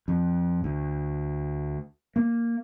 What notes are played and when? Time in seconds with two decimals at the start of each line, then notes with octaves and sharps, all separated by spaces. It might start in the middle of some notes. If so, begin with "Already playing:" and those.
0.08 F2
0.64 D2
2.16 A#3